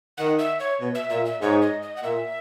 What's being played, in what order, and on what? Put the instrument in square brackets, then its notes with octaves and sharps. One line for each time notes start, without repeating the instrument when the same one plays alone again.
[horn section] D#3 [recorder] F#5
[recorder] E5
C#5
[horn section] B2
[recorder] E5
[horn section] A#2 [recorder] E5
[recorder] E5
[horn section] G#2 [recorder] C#5
[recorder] D#5
D#5
F#5
[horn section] A#2 [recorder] E5